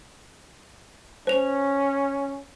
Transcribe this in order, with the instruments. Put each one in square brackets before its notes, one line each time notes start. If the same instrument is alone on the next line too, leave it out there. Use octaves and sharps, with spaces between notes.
[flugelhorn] C#4 [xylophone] C5 F7